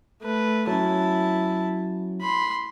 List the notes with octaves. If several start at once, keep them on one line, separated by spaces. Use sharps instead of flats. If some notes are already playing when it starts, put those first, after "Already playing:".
A3 B4
F#3 C#4 E4 A5
B5 C6